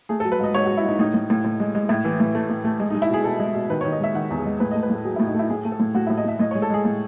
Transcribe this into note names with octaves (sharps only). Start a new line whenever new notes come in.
A3 G#4
A4
F#3
B4
G#2 D#5
G#2 C#5
F#4
G#2
E4
G#2 D#4
A2 D#4
A2
A2
A2
G#3
G#3
A2 E4
E3
A2
A3
A2
A3
G#3
D#4
G#3
E4
B2 G#4
B2 A4
G#3
B2
D#3 B4
C#5
D#3
D#5
G#3 E5
D#3 F#5
E2
G#4
G#3
A2 B4
D#5
A3
B4
A2 A4
F#3 G#4
E4
A2
D#4
A3 E4
A2 G#4
A3
A4
A2
A2 F#4
E4
A2
D#5
A2 E5
A2 D#5
C#5
G#3
A4
G#3 G#4
A2